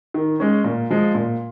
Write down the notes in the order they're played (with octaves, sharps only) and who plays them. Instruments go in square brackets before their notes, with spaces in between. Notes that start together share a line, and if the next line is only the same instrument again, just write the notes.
[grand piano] D#3
G#3 C#4
A#2
F3 G#3
A#2